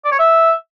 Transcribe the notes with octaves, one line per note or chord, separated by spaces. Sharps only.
D5
C#5
E5